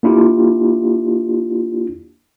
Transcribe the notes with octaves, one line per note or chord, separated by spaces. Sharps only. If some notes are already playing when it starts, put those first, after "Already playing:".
A#3 D4 E4 F4 G4